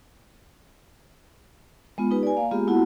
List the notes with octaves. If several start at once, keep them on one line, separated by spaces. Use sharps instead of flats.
G#3 B3 F4
D#4 G4 B4
D5 G#5
A#3 F5
G#3 A#3 B3 F4 G4 G#4
A#3 B3 E4 F#4 F#5 A5